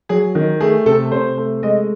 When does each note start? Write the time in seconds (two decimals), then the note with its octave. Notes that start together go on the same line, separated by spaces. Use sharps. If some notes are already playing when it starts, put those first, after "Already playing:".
0.09 F#3 G#4
0.35 D#3
0.60 A3 G#4
0.86 C3 A4
1.12 C3 C5
1.37 A3
1.63 G#3 D#5